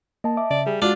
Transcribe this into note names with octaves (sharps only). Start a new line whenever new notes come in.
A#3 D#5 A5
E5 D6
C#3 D5
G3 G#4
G#3 D4 F4 F#4 A6